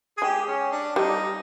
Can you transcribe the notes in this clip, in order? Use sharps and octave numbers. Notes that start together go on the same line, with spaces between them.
G#4
G#3 G4
C#4
D4
G3 D#4